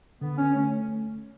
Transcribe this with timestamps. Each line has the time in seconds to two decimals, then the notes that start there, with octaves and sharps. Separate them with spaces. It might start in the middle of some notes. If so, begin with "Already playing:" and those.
0.21 D3 B3
0.37 C#4
0.54 A3 C#4